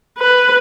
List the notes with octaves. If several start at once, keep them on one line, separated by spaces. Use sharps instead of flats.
B4